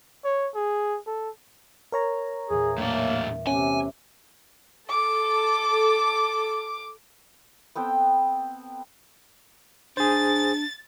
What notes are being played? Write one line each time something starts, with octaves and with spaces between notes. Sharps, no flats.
C#5
G#4
A4
A#4 C#5 A#5
E2 A#2 G#4
A2 G3 A#3 D4 E5
C3 A3 B3 C#4 G#5
A4 D6
B3 C4 A4 G5
D4 G#4 C5 A6